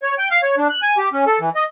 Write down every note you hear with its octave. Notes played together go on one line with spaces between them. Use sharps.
C#5
G5
F5
C#5
D4
F#6
G#5
G4
C#4
A4
E3
D#5